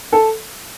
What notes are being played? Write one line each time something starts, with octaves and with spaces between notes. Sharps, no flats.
A4